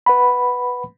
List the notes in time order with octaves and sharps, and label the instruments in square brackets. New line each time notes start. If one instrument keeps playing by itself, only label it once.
[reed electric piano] B4 F#5 B5